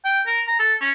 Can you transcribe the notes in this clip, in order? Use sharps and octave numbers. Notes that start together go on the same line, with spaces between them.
G5
A#4
A#5
A4
C#4